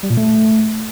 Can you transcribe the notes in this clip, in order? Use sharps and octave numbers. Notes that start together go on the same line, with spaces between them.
G3
A#2
A3